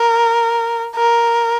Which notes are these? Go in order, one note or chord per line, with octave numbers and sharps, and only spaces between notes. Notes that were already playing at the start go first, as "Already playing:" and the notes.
Already playing: A#4
A#4